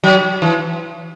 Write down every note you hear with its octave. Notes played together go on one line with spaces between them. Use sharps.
F#3
E3